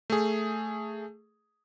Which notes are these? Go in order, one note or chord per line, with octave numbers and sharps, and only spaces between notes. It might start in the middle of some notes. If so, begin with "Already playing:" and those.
A3 G#4